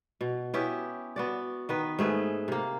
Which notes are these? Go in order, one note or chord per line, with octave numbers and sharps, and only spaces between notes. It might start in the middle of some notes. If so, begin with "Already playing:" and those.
B2
B3 C#4 E4 G4
B3 F#4 D5
D#3 B3 B4
G#2 A3 G#4 B4
C3 A#3